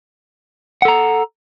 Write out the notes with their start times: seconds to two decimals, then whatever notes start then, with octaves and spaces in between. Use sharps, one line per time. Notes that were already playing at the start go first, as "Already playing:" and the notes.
0.82 F#5
0.85 A4
0.88 A#5